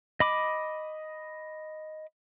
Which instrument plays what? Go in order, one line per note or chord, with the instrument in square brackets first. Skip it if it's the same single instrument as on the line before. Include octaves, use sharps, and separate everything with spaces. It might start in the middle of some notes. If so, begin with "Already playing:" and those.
[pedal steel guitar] D#5 B5 D6